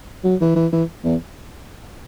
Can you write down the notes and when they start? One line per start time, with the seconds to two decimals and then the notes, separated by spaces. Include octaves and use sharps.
0.24 F#3
0.41 E3
0.56 E3
0.72 E3
1.04 E2